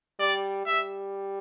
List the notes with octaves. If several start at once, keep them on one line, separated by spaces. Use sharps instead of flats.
G3 D5
G3 E5